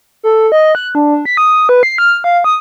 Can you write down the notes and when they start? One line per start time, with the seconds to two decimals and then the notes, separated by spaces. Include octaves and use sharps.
0.23 A4
0.52 D#5
0.75 F#6
0.95 D4
1.25 B6
1.37 D#6
1.69 B4
1.83 C7
1.98 F6
2.24 F5
2.44 D#6